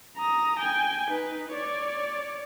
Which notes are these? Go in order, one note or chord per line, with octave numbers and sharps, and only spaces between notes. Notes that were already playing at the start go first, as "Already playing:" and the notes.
A#5 D#6
G5 G#5
D#4 B4
C#5 D5